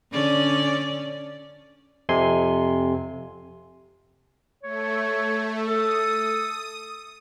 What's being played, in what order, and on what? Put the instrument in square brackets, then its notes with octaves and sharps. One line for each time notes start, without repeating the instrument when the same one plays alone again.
[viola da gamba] D3 C#4 D5
[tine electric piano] F2 C3 G#5 C6
[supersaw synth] A3 [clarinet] C#5
[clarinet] A4 [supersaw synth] D#6